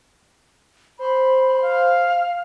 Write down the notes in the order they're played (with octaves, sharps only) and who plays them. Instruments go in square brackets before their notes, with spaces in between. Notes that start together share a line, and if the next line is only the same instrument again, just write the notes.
[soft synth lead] C5 [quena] B5
[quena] F5